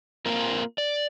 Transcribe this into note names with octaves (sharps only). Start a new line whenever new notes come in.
A#3 C4 F4 A#4
D5